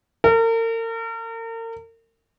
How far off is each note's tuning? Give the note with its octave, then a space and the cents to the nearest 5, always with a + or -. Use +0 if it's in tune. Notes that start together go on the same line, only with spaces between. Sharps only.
A#4 -40